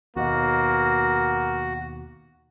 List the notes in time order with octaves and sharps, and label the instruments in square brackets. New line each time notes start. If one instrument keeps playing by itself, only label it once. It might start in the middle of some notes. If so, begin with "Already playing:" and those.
[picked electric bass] D#2 B2 [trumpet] A#3 [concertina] F#4